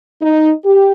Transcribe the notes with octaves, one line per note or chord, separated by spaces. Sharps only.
D#4
G4